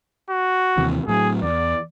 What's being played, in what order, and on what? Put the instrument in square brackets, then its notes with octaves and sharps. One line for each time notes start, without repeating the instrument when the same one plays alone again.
[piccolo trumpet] F#4
[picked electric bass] D#2 C3 E3
[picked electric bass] A2 F#3 [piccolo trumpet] G#4
[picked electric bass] E2 [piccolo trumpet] D5